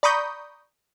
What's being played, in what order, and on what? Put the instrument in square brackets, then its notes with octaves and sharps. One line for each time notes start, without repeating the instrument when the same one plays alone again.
[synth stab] D5 A#5 B5 C#6 D#6 G6